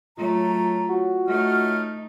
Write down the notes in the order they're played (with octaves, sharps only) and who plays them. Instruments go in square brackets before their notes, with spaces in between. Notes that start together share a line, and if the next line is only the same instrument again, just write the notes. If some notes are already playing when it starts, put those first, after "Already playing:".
[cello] F#3 A3 [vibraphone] F4 C#5 [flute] A#5
[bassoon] F#4
[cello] A3 D#4 [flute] F6